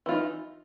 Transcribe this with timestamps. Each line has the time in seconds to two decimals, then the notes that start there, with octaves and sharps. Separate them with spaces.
0.06 E3
0.09 F4
0.11 D#4